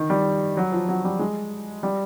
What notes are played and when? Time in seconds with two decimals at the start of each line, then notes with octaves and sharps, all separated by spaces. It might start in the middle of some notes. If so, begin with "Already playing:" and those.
Already playing: D#3
0.10 G3
0.57 F#3
0.72 F3
0.89 F#3
1.04 G3
1.19 G#3
1.83 G3